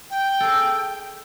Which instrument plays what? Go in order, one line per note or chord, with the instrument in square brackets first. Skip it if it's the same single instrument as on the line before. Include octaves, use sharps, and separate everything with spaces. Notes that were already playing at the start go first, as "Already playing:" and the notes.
[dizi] G5
[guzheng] G#4 A4